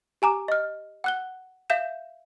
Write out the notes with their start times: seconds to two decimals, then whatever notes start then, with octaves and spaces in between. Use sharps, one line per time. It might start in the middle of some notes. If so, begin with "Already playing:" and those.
0.22 G4 G#5 A#5 D6
0.48 D#5 F6
1.04 F#5 F#6 G7
1.70 E5 F5 G6 E7